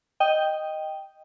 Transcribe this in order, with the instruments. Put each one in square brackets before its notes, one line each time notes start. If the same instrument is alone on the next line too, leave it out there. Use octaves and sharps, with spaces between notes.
[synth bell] D#5 G5